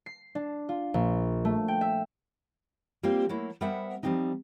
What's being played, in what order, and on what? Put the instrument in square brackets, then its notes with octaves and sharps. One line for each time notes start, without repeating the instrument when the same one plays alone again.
[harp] C7
D4
F4
A#1
A3
G5
E5
[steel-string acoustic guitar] G3 A#3 C4 F4 G4 C5
F#3 A3 A#3 E4
G3 B3 A#4 C5 E5 F#5
F3 G3 A#3 C4 D#4